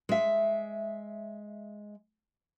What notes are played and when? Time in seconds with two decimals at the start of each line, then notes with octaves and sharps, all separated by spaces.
0.09 G#3 E5